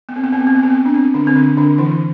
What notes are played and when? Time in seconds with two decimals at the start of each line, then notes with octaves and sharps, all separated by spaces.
0.09 B3
0.16 C4
0.24 B3
0.32 C4
0.40 B3
0.47 C4
0.55 B3
0.63 C4
0.70 B3
0.86 D4
0.94 C4
1.14 D3 D4
1.27 C4
1.36 D3 D4
1.57 D3 D4
1.78 E3 E4